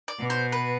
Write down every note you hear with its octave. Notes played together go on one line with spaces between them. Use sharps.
D5
B2
C5
B4